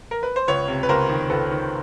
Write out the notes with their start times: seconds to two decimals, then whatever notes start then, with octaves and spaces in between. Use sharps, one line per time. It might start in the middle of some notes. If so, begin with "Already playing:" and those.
0.11 A#4
0.23 B4
0.36 C5
0.48 C#2 B4 C#5
0.68 C3
0.83 B4
0.89 C#2 A#4 C5
1.09 D#3
1.30 C#2 A4 B4
1.51 D#3